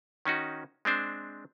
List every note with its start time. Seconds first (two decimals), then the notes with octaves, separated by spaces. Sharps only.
0.25 D#3 C#4 D#4 F#4
0.85 G#3 C4 D4 C5